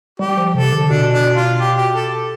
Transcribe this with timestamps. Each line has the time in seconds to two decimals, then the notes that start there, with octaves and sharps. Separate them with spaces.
0.19 G3 G4
0.37 F3
0.54 C3 A4
0.72 D3
0.89 B2 D4
1.13 D4
1.36 F4
1.60 G4
1.77 G4
1.95 A4